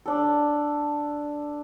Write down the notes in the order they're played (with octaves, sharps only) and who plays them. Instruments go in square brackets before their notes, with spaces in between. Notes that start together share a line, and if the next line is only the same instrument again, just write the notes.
[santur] D4 A4